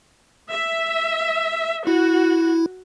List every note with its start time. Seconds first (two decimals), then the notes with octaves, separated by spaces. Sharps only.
0.51 E5
1.87 E4 F#4